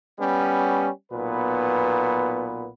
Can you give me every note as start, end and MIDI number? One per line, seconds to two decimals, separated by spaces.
0.19 0.89 55
0.19 0.89 59
0.19 0.89 61
1.12 2.69 35
1.12 2.69 46
1.12 2.69 59
1.12 2.69 71